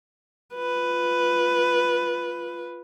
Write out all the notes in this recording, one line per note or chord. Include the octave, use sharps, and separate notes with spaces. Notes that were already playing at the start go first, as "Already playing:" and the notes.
F4 B4